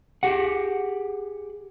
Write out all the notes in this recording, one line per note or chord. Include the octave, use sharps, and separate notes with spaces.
G4 G#4 F#5